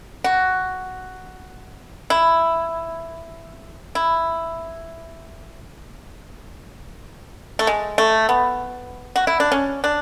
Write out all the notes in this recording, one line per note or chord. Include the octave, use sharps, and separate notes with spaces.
F#4
E4
E4
A3
G#3
A3
B3
F#4
E4
D4
C#4
D4